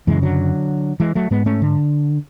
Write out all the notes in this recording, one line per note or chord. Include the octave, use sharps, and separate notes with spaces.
F#2 C#3 E3 G#3
D3 F#3
E3 G#3
F#3 A3
G#2 G#3 B3
A3 C#4
D3